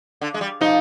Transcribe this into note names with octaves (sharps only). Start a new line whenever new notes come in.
D3
G#3
G3
F3 D#4